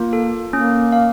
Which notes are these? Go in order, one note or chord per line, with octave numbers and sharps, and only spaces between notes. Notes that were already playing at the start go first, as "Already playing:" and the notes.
Already playing: A#3 F4
A4
A#3 C#4
F5